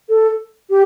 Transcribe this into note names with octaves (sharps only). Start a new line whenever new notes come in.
A4
G4